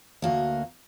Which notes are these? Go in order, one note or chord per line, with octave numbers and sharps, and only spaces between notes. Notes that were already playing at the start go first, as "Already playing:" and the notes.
D2 A#3 F#4